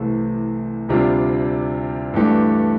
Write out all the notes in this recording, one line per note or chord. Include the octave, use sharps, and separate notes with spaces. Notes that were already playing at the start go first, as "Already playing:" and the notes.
Already playing: C2 C3 E3 A3
D2 C3 G3 D4 F4
G2 E3 A3 D4 G4